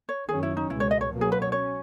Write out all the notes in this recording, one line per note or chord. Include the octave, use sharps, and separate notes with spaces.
C#5
F#2 D#3 F#3 C#4 G#4
E4
D#4
C#2 B2 G#3 E4
C#5
D#5
C#5
B2 F#3 A#3
G#4
B4
C#5
C#4 C#5